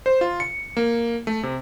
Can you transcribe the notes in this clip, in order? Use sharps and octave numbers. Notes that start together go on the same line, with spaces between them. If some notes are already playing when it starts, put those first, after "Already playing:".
C5
F4
C#7
A#3
A3
C3